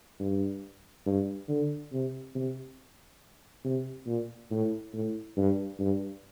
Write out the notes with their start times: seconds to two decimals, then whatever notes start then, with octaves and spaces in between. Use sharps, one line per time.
0.20 G2
1.06 G2
1.48 D3
1.92 C3
2.35 C3
3.64 C3
4.06 A#2
4.50 A2
4.93 A2
5.36 G2
5.79 G2